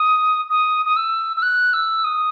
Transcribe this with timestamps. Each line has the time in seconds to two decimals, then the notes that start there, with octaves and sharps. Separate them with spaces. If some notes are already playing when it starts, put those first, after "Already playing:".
Already playing: D#6
0.50 D#6
0.86 D#6
0.96 E6
1.36 E6
1.42 F#6
1.73 E6
2.04 D#6